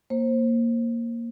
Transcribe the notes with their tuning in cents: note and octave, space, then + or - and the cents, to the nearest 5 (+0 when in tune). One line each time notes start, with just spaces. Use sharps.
A#3 +0 C5 +20